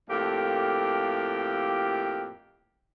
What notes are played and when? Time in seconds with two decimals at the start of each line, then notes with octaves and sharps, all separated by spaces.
0.10 F2 A2 A#3 G4